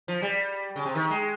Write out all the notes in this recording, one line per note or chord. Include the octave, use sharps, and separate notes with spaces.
F3
G3
C#3
C3
D#3
G#3